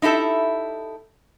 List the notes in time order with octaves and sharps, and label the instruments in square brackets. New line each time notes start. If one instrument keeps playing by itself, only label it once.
[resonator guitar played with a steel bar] D#4 E4 G4 A4 E5